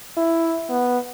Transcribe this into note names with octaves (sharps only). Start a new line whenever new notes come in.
E4
B3